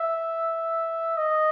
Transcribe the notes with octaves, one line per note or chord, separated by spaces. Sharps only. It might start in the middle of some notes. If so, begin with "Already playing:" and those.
Already playing: E5
D#5